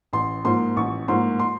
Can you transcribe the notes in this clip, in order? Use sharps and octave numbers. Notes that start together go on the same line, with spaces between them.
A1 C6
G#2 F3 A#3 C6
A1 C#6
G#2 F3 A#3 C6
C6